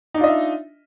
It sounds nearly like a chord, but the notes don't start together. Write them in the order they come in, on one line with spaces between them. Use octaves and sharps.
D#4 D4 F4 D#5 E5